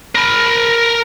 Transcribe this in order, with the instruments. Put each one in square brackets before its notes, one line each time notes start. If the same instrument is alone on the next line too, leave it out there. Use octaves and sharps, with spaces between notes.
[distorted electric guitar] A#4 B5